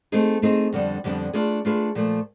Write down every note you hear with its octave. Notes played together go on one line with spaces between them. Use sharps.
A3 C4 D#4 G#4
A3 C4 D#4 G#4
F2 D3 G3 B3 D4
F2 D3 G3 B3 D4
A3 D4 F4 G#4 B4
A3 D4 F4 G#4 B4
A#2 F3 A3